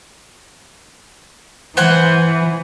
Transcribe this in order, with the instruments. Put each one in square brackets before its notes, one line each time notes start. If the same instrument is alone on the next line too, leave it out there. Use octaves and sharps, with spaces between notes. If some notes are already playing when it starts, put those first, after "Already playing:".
[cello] E3 [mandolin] C5 F#5 G#5